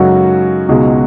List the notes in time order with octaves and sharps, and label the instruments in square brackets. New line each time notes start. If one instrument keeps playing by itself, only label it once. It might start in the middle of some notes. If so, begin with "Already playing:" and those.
Already playing: [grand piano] F#2 C#3 G#3 D#4 A4 [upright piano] F#3 F#4
[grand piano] C#2 B2 G#3 D#4